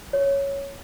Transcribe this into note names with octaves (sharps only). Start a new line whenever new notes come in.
C#5